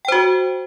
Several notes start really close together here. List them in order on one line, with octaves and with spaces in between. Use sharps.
G5 C5 F#4